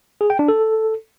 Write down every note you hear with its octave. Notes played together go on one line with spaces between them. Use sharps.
G#4
G5
D4
A4